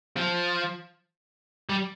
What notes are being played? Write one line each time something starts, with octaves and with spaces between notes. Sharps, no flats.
F3
G3